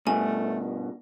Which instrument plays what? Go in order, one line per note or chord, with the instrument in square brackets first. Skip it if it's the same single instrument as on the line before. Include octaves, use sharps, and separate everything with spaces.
[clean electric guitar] G2 B2 [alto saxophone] A3 [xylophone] G#5